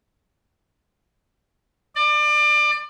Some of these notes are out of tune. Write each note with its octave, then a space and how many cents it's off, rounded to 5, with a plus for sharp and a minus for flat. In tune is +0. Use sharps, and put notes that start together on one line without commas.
D5 +30